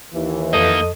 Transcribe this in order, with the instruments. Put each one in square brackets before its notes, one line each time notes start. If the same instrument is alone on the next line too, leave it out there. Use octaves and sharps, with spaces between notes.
[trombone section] D#2 E3
[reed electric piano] F2 A4 D#5 [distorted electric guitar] A#3 D#4 [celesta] D#6 D#7